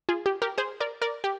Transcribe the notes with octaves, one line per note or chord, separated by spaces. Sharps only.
F4 G#4
G4
G4 A#4
G#4 C5
A#4 D5
A#4 D5
G4